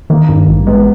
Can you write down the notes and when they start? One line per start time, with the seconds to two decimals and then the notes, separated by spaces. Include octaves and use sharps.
0.10 D#3 A#3
0.29 G2
0.47 A1
0.67 G#3 B3